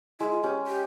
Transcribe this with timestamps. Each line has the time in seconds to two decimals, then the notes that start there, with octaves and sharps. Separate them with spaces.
0.20 G#3 E4
0.31 F4
0.43 C#4 G4
0.67 G4